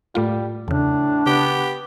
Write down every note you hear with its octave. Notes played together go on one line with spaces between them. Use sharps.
A2 G3 A3 F4
E2 A2 C#3 D4
C#3 B3 G4